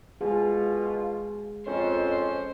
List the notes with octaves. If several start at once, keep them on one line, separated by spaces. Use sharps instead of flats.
B2 G#3 F4 G#4
F2 C#4 C5 D#5